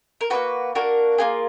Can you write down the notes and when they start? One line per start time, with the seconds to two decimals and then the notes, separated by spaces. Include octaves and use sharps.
0.21 A#4
0.30 A#3 D4 F#4 B4
0.75 A#3 D4 F#4 A#4
1.18 A#3 D4 F4 G#4